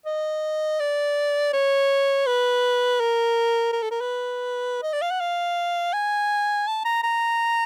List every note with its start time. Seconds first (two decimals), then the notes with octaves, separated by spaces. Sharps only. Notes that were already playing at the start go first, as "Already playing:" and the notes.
0.06 D#5
0.80 D5
1.53 C#5
2.26 B4
3.00 A#4
3.73 A#4
3.82 A4
3.91 A#4
4.01 B4
4.83 D#5
4.93 D5
5.02 F5
5.11 F#5
5.20 F5
5.93 G#5
6.67 A5
6.85 A#5
7.03 A#5